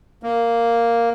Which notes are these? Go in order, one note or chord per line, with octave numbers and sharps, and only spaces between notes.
A#3